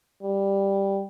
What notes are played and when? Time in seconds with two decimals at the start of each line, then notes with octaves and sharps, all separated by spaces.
0.22 G3